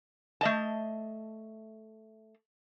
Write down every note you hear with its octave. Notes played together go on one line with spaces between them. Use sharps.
A3 D#5 A5